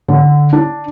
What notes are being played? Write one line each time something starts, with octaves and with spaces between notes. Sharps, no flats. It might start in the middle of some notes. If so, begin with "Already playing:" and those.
D3
D4